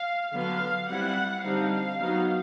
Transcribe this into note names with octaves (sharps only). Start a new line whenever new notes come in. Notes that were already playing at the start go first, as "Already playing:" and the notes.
Already playing: F5
D3 F#3 B3 F5
G3 C4 E4 F#5
D3 G3 C4 D#4 F5
F#3 B3 D#4